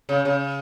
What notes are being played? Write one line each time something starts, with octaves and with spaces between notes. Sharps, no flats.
C#3
C#3